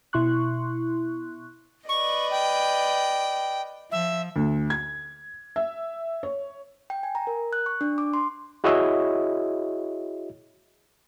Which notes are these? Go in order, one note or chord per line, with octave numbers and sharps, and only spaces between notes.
B2 E4 C6 C#6 F#6
B4 D5 D#5 C#6
G5
F3 E5
D2
G#6
E5
C#5
G5
G#5
A#5
A#4
F#6
C#6
D4
D6
C6
E4 F#4 G#4 C#5 D#5 E5